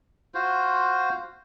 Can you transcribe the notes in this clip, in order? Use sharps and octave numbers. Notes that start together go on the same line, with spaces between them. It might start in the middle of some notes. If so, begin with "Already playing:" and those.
F4 F#4 C5